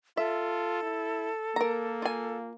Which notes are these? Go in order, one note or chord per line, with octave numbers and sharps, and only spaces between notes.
F4 A4 E5
E4
A#3 A#4 A#5
F4 G#5